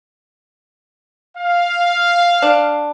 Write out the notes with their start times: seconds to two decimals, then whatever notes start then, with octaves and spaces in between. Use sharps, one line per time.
1.37 F5
2.42 D4